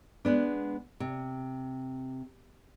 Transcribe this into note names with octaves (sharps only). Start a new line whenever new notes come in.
G#3 B3 D4
C3